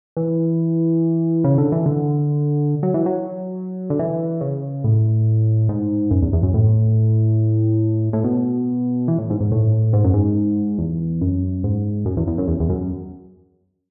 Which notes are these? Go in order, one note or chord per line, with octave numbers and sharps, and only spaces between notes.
E3
C#3
D3
E3
D3
F#3
E3
F#3
D3
E3
C#3
A2
G#2
F#2
E2
E2
F#2
A2
A2
B2
E3
A2
G#2
G#2
A2
G#2
F#2
G#2
E2
F#2
G#2
F#2
E2
E2
F#2
E2
E2
F#2